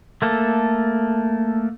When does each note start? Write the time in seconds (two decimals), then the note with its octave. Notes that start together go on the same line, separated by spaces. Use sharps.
0.22 A3 A#3 A4